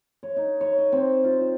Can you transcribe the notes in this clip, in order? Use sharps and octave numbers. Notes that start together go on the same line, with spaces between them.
C#5
D#4
C#5
D#5
C4
F4
F4